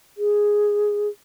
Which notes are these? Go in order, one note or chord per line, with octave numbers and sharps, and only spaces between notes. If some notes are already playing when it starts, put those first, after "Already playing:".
G#4